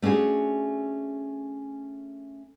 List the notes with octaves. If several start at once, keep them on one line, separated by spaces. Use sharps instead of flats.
A3 C#4 D4 F#4 G#4